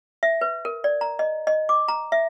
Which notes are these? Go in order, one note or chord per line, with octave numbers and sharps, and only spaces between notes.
E5
B4
A#4
D5
A#5
D#5
D#5
D6
A#5
E5